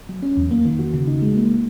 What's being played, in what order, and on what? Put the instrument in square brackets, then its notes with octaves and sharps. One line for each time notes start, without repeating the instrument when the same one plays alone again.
[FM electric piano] F#3
C#4
E2
A#3
D#3
F#4
C#3
D#4
G#3
A#3